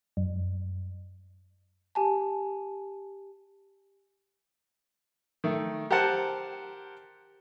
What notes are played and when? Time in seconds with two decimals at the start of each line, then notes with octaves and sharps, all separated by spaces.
0.17 F#2
1.95 G4 G#5 A5
5.44 D#3 A3
5.91 G4 A#4 C5 F#5 A5